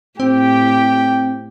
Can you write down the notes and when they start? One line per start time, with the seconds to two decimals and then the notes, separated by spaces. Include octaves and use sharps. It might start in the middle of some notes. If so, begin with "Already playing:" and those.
0.20 A2 C4 G4 G5